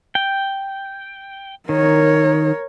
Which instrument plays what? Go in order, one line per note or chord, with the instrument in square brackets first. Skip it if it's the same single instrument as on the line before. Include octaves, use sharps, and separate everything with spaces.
[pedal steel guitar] G5
[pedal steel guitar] D#3 [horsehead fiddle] A#4 C#5